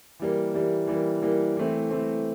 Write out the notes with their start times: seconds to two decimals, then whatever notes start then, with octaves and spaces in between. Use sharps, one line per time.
0.19 E3 G3 A#3
0.54 E3 G3 A#3
0.87 E3 G3 A#3
1.22 E3 G3 A#3
1.57 E3 A3 C4
1.91 E3 A3 C4